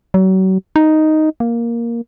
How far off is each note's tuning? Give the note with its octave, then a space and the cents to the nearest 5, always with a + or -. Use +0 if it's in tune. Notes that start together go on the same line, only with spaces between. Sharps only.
F#3 +35
D#4 +0
A#3 +5